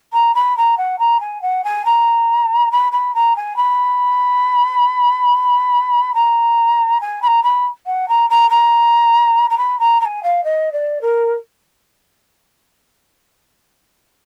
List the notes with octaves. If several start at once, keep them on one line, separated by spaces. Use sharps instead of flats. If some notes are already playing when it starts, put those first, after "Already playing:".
A#5
B5
A#5
F#5
A#5
G#5
F#5
G#5
A#5
B5
B5
A#5
G#5
B5
A#5
G#5
B5
A#5
B5
F#5
A#5
A#5
A#5
A#5
B5
A#5
A#5
G#5
F5
D#5
D5
A#4